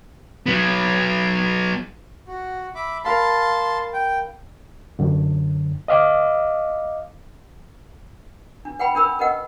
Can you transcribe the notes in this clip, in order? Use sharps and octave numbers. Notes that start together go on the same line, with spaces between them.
F#3 B3
F#4
E5 B5 D6
A#4 F5 A5 B5 C6
G5
F#2 D3
D#5 F5 D6
D4
B4 F#5 G5 B5
C#4 D4 A#4 B5 E6
A#4 B4 D#5 F#5